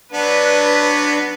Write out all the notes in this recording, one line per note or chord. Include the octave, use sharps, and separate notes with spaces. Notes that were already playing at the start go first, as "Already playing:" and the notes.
F#3 B3 D4 B4